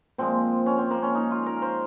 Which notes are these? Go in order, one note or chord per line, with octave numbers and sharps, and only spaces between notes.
A#2 F3 G#3 C4
C#4
C4
A#3
C#4
D#4
F4
A#4
C5